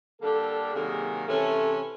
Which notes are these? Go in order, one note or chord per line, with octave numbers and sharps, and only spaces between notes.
D3 G3 A#3 D4 G4 A4
C3 D#3 F#3 A#3 G#4
C3 E3 A3 C#4 A4